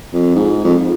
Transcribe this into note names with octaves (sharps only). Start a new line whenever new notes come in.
F2
G#2
F2